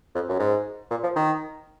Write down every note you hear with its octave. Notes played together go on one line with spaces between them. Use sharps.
F2
F#2
G#2
A#2
F3
D#3